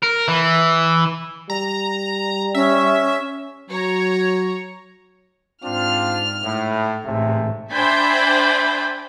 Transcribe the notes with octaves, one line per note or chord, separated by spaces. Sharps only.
A#4
E3
G3 A#5
C#4 E5
F#3 C#5 A#5
G#2 C4 D4 F4 F6
A2
A1 G#2 C3 G#3 A3
D4 C5 E5 G5 G#5 B5